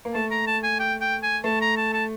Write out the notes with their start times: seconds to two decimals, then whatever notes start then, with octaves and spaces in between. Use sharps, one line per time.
0.05 A#3
0.14 A3 A5
0.31 A#5
0.47 A5
0.63 G#5
0.79 G5
1.01 G5
1.22 G#5
1.44 A3 A5
1.61 A#5
1.77 A5
1.93 A5